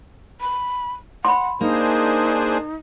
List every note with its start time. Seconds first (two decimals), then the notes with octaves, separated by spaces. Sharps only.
0.41 B5
1.25 F#5 B5 C6
1.61 A#3 D4 D#4 G#4 C5